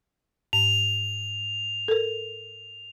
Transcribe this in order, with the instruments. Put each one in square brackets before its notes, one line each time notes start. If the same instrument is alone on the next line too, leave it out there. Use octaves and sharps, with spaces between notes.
[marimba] G#2 [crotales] F7
[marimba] A4 A#4